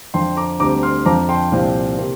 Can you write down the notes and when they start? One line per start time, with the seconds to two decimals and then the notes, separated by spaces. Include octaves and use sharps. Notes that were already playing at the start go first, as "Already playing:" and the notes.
0.14 F2 D3 F3 G5 C6
0.37 A#5 D6
0.60 D2 D3 G3 C4 A#5 D6
0.83 C6 F6
1.06 F2 D3 F3 C4 A#5 D6
1.29 G5 C6
1.52 C2 A#2 F3 C4
1.98 C3 A#3